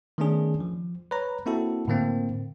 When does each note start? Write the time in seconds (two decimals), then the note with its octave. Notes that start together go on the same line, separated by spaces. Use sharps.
0.18 D#3 A3 B3 C#4 D4 G#4
0.60 F3
1.11 B4 C#5 A#5
1.46 A#3 C4 E4 F#4 A4
1.88 A2 D3 A#3 C4